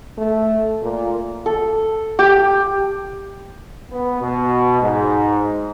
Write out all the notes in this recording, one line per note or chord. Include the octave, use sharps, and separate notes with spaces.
A3
A#2
A4
G4
B3
B2
G#2